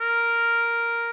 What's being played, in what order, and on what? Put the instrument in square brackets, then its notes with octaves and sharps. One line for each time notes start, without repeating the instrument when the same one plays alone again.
[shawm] A#4